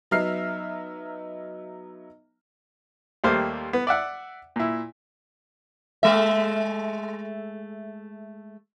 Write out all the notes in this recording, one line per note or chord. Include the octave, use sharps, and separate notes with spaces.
F#3 B3 D#4 E5 F6 C7
D#2 G3 A3 A#3 C5 F5
B3
D5 E5 F#5
A#2 E4
G#3 A3 E5